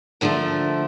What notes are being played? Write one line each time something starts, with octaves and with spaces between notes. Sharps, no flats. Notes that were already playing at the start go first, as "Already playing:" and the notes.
D3 F3 A3 A#4